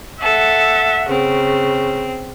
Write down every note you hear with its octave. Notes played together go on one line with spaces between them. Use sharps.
A4 E5 F#5
C#3 C4